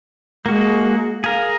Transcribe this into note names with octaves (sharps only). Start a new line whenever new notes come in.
G#3 A#3 F#4
G#4 A#4 F5